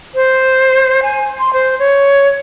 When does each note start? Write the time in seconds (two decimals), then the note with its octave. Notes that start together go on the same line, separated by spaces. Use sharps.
0.15 C5
1.03 G#5
1.39 C6
1.53 C5
1.79 C#5